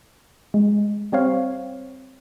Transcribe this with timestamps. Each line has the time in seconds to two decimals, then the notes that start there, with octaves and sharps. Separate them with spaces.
0.54 G#3
1.12 G3 C4 C#5 F5